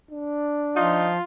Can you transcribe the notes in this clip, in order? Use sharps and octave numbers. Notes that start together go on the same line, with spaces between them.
D4
F3 D#4 F4